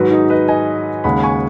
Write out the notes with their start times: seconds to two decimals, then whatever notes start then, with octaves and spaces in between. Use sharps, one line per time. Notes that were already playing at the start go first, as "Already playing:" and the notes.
Already playing: G#2 D#3 F#3 F#4 B4
0.11 D#4 G#4
0.30 B4 D#5
0.48 D#5 G#5
1.04 D#2 C#3 G#3 F#5 B5
1.23 G#5 C#6